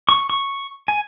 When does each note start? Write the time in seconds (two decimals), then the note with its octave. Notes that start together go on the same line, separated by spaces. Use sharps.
0.09 C#6
0.30 C#6
0.88 G#5